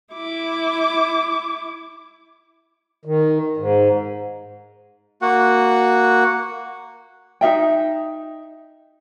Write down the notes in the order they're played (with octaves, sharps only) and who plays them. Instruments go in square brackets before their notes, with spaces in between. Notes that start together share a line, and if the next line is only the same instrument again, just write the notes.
[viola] E4 D6
[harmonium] D#3
G#2
[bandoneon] A#3 F#4 F#5
[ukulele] D#4 G#4 E5 G5